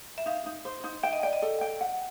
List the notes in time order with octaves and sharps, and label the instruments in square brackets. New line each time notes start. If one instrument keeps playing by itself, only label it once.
[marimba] E5
[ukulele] D#4 [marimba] F5
[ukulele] D#4
C5
D#4
[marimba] E5 [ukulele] G5
[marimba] D#5
[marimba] D5 [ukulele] G5
[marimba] D#5
[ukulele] A4
G5
F#5